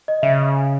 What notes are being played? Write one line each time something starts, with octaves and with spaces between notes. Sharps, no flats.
D#5
C#3 E5